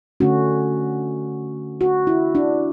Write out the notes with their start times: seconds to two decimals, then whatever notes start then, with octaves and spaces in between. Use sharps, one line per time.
0.20 D3 A3 C#4 F#4
1.81 F#4
2.07 E4
2.35 D4